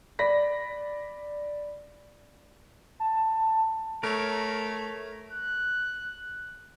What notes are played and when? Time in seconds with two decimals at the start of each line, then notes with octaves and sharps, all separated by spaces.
0.19 D5 B5 A#6 B6
3.00 A5
4.03 A3 A#4 C#5
5.32 F#6